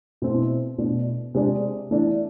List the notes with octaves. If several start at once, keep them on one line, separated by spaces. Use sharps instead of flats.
B2 A3 C4 E4
B2 A3 D4
C3 G#3 D4
E3 A3 D4